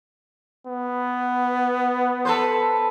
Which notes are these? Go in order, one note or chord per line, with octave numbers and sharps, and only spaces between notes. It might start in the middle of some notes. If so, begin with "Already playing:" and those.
B3
A4 B4 C5